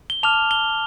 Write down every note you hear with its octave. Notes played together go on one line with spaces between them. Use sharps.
G7
A5 D6 F6 F7
G7